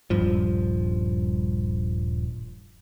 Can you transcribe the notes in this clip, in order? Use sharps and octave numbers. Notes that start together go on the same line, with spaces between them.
D#1 G2 F3